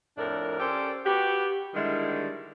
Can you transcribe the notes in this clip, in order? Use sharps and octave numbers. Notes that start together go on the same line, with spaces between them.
F2 A2 D4 A#4
C#4 G4 A4 C5 D5
B3 F#4 G4
D3 D#3 G3 G#3 E4